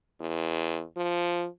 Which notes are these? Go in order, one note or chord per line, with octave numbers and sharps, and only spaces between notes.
E2
F3